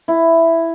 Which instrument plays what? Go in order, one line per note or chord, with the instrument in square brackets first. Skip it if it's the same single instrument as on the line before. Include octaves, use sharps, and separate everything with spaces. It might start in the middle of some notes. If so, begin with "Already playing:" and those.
[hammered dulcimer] E4